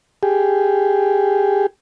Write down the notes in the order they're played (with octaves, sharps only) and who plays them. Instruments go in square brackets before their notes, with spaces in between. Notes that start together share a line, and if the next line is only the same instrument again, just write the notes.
[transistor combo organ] G4 G#4